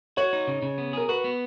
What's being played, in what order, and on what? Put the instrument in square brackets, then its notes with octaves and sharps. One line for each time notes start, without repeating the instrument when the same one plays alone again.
[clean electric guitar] F#4 [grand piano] C#5
[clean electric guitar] D#4
C#3
C#3
B3
[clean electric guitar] G#4 [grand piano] A#4
[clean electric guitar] F#4 [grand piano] B4
[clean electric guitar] B3